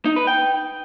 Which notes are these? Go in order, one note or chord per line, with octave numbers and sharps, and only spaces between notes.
D#4
B4
G5